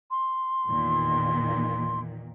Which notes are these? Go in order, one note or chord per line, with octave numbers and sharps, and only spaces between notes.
C6
E2 A#2 D#3